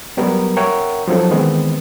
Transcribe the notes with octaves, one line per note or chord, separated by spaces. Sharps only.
F#3 G3 B3 A#4
A#4 C#5 E5 F#5 G5
F3 F#3 C4 D#4 A4
D#3 E3 G#3 B3 C4